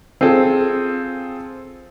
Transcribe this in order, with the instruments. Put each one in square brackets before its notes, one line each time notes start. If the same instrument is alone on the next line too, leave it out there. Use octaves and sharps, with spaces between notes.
[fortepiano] C4 F4 G#4 A4